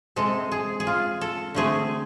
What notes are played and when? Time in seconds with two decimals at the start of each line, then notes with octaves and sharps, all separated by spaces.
0.16 C3 G#3 C4 A4
0.52 G#4
0.80 G#4
0.87 F4
1.21 A4
1.54 D3 A3 C4 G#4